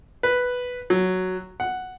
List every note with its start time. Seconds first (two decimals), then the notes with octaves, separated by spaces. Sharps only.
0.23 B4
0.90 F#3
1.60 F#5